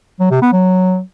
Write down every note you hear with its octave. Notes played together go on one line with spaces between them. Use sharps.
F#3
C3
B3
F#3